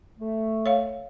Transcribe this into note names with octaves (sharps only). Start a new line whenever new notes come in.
A3
C#5 F5